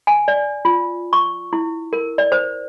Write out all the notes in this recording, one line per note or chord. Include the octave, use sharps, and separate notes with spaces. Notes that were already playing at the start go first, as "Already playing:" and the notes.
G#5
D5
F4
C#6
E4
A#4
D5
C5